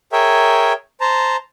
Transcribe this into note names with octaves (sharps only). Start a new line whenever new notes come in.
G#4 A#4 C#5 E5 G5
C5 A5 A#5